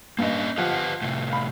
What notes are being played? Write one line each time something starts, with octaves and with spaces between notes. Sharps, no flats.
G2 A#3 C#4 D#5
F3 G4 B4 F#5
A2 C3
F5 B5